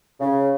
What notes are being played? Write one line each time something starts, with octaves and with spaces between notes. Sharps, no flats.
C#3